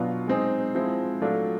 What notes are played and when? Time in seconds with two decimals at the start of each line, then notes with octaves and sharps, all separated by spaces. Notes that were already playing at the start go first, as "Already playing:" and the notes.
Already playing: B2 F#3 B3 D4 F4
0.27 G#3 C4 D#4 G#4
0.75 F3 G#3 C4 E4
1.22 F#3 A3 D4 F4 A4